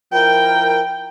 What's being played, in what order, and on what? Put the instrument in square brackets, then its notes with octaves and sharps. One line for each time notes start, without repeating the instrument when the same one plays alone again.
[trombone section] F3 E4 A#4 [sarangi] G5